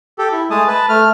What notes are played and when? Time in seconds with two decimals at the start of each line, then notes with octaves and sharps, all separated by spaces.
0.18 G4 A4
0.32 E4
0.50 G#3 A3 G#4 A5 D#6
0.68 B4 A5
0.89 A3 F6